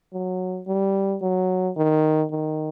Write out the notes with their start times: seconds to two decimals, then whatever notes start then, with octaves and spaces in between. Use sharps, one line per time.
0.13 F#3
0.67 G3
1.22 F#3
1.76 D#3
2.31 D#3